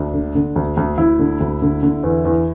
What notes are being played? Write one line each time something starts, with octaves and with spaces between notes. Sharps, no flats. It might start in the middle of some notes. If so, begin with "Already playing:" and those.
Already playing: D2 D4
D3
D3
D2
D2
D2 E4
D3
D2
D3
D3
E2
E2